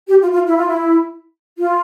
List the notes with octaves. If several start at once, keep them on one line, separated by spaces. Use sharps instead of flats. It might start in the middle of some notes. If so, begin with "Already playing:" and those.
G4
F4
F4
E4
F4
E4
F4